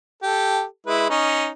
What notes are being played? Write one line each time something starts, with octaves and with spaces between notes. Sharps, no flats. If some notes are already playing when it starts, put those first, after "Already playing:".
G4 A4
G#3 E4 B4
C#4 D#4